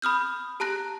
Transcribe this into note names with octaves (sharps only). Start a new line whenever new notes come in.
B5 D#6 F6 G6
G4 A5 A#5 F#6 A#6